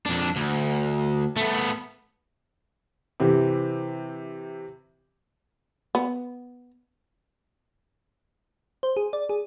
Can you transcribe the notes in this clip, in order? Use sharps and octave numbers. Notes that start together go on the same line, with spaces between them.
F2 D4
D2
A3 B3
C3 E3 C4 G4
B3
C5
G#4
D5
G#4